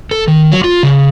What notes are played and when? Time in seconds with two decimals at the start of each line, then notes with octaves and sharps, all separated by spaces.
0.11 A4
0.28 D#3
0.52 F#3
0.64 F4
0.83 C#3